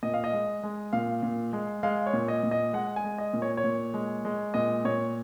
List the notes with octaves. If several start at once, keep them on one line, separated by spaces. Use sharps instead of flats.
A#2 D#5
F5
D#5
G#3
G#3
A#2 F5
A#2
G#3
G#3 F5
C#5
A#2
D#5
A#2
D#5
G#3 F#5
G#5
G#3
D#5
A#2
C#5
C#5
A#2
G#3
G#3
A#2 D#5
A#2 C#5